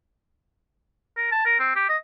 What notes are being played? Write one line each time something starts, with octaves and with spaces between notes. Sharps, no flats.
A#4
A5
A#4
C4
G4
D#5